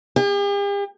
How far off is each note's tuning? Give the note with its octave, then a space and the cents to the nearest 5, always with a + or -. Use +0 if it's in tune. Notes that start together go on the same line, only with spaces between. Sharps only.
G4 +45